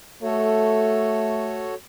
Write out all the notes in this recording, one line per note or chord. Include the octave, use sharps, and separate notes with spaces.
A3 F#4 A4 C#5